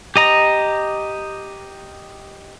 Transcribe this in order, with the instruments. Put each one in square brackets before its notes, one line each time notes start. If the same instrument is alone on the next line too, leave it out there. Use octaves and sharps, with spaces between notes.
[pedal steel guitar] G4 D#5 A#5